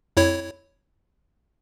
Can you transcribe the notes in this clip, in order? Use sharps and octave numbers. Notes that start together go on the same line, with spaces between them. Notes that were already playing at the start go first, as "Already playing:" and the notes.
F2 E4 C#5